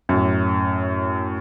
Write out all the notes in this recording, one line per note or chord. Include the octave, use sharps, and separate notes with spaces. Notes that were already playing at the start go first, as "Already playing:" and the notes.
F#2 A2